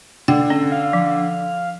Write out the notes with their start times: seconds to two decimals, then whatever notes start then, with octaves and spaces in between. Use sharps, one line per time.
0.28 D3 G5
0.50 C#4
0.72 F5
0.93 F3